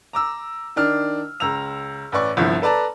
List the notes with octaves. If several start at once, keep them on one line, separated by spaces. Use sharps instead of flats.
A#5 D6 E6
D#3 D4 F6
C#2 A#5 E6 F7
A1 B4 D5 C#6
G1 C2 F3 E4
A4 B4 D5 A5 A#5